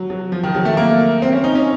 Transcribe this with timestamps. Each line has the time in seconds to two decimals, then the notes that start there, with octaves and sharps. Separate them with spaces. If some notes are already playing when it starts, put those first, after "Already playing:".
Already playing: F#3
0.10 F#3
0.32 F3
0.43 D#3
0.55 F#3
0.65 A3
0.77 A#3
1.22 C4
1.32 C#4
1.44 D#4
1.55 C#4